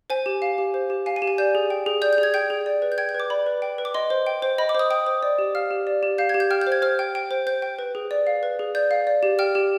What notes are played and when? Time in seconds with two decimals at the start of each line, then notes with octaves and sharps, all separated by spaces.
0.10 C5 G#5
0.26 G4
0.42 F5
0.58 G4
0.74 C5
0.90 G4
1.06 F5 G#5
1.16 G#5
1.22 G4
1.28 G#5
1.38 D5 G6
1.55 G#4
1.70 G5
1.86 G#4
2.02 D5 G6
2.13 G6
2.18 G#4
2.23 G#6
2.34 G5 G6
2.50 G#4
2.66 D5
2.82 B4
2.92 G6
2.98 G5 G#6
3.09 G6
3.15 B4
3.20 D6
3.30 D5 B5
3.46 B4
3.62 G5
3.78 B4
3.85 D6
3.94 D#5 C6
4.10 C5
4.27 G5
4.42 C5
4.58 D#5 B5
4.69 D6
4.75 C5 D#6
4.90 G5 D#6
5.07 C5
5.23 D5
5.38 G4
5.55 F5 F6
5.71 G4
5.87 D5
6.03 G4
6.18 F5 G6
6.29 G#6
6.34 G4
6.40 G6
6.50 G5 F6
6.61 G6
6.67 C5
6.72 G#6
6.82 C5 F6
6.99 G5
7.15 G5
7.31 C5
7.47 C5 G6
7.62 G5
7.79 B4
7.95 G#4
8.11 D5
8.27 F5
8.43 B4
8.59 G#4
8.75 D5 G6
8.91 F5
9.07 D5
9.23 G4
9.39 G5 F6
9.55 G4